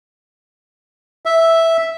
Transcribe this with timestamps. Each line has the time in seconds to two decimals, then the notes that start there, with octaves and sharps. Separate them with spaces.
1.26 E5